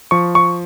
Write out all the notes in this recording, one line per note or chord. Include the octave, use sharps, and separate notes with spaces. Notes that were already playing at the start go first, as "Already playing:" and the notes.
F3 C#6
C#6